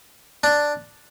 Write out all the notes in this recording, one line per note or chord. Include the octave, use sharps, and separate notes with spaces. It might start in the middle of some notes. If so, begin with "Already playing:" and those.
D4